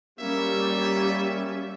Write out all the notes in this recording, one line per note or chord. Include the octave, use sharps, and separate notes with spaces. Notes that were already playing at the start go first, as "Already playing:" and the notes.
G3 A#3 C#4 E5